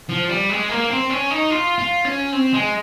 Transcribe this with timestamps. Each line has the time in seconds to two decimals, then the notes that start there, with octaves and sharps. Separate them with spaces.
0.09 F3
0.29 G3
0.50 G#3
0.69 A#3
0.90 C4
1.10 C#4
1.31 D#4
1.51 F4
1.78 F4
2.05 C#4
2.32 C4
2.53 G#3